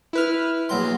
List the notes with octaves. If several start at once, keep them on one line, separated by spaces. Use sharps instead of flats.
E4 B4 F6
A#1 F#3 C6